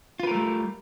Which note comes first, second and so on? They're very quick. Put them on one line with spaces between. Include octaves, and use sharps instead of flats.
F4 B4 A#4 A3 G3